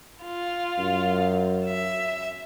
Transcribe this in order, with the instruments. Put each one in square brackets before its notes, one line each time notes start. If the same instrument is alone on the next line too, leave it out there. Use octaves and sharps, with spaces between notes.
[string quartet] F4
[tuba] F#2
[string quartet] E5